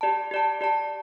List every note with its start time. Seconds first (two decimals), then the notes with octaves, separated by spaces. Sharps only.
0.01 G4 D5 A5
0.31 G4 D5 A5
0.61 G4 D5 A5